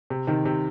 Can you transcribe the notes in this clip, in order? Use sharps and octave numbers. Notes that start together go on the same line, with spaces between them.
C3
C3 D#3
C3